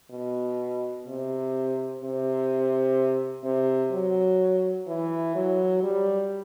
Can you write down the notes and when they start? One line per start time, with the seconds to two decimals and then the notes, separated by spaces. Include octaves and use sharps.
0.10 B2
1.05 C3
2.01 C3
3.44 C3
3.92 F#3
4.87 E3
5.35 F#3
5.83 G3